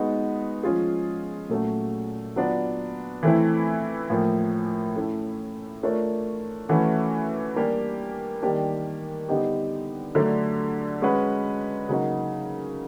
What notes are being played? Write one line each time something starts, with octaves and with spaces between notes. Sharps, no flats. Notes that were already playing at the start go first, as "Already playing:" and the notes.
Already playing: G#3 B3 D#4 F#4
F3 G#3 C#4 F4 G#4
A#2 F#3 A3 C#4 F#4
F#3 B3 D4 F4
E3 A3 C4 E4
A2 F3 A#3
A3 C#4 E4
A3 D4 F4 A#4 C#5
E3 A3 C#4 F#4 B4
G3 A#3 D4 G4
D#3 G3 A#3 D4 G4
D3 G3 B3 D#4 G4
D3 F#3 A3 D4
G#3 C#4 F#4 B4
C#3 F#3 A#3 D#4 F#4